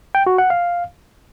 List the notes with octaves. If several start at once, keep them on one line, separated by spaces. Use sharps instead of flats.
G5
F#4
F#5
F5